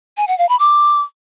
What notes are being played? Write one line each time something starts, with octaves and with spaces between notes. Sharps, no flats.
G#5
F#5
F5
B5
D6